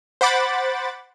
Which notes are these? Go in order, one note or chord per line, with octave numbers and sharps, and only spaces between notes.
C5 F#5 B5 D6 A6